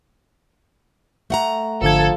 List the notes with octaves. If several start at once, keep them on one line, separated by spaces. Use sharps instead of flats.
A3 F#5 A#5
G#1 D3 F3 A4 G#6